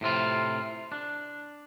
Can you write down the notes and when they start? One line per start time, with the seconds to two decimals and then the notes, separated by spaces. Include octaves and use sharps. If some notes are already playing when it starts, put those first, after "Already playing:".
0.01 A2 C3 C4 F4
0.92 D4